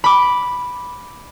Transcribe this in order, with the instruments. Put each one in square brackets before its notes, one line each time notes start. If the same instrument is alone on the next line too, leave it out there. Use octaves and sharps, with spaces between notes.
[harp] B5 D6